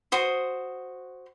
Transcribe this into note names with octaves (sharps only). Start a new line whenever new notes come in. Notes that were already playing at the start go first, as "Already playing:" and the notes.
F#4 C5 D#6